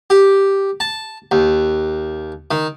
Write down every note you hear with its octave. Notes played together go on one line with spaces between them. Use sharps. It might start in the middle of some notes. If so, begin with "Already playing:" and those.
G4
A5
D#2
D#3